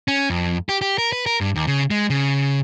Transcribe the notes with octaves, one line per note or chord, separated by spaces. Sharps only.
C#4
F2
G4
G4
A#4
B4
A#4
G2
D#2
C#3
G#3
C#3